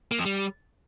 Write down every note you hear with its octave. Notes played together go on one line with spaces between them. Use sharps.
A#3
F2
G3